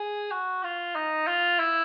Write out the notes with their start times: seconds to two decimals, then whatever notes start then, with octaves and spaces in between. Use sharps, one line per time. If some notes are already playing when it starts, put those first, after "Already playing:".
Already playing: G#4
0.31 F#4
0.64 F4
0.96 D#4
1.27 F4
1.59 E4